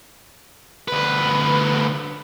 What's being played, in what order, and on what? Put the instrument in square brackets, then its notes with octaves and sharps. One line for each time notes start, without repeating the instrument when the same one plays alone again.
[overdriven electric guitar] D2 B4